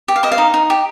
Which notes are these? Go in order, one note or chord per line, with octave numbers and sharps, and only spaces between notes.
G4
F5
C5 D#5
F5
D#4
D#4
G4